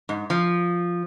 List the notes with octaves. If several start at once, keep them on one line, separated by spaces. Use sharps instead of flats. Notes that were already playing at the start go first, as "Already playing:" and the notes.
G#2
F3